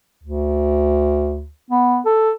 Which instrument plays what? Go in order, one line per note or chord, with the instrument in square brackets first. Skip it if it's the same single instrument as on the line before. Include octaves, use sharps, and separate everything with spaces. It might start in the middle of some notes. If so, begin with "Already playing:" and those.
[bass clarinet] D2
B3
A4